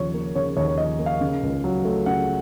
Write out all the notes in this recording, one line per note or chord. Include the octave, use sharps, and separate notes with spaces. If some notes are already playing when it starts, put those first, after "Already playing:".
Already playing: D#2 C#3 F3 C#5
A#3
C#3 C#5
D#2 C#5
C#5
F3 D#5
A#3
F5
C#3
C#2
F#3
A3
C#3 F#5